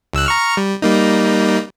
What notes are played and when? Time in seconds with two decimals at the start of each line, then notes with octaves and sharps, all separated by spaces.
0.13 C#2 E6 F#6
0.26 A#5 C#6 F6
0.57 G3
0.82 G3 A#3 D#4